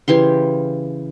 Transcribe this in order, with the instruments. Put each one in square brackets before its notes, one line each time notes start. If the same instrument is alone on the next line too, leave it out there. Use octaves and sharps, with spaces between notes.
[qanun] C#3 E3 G4 C6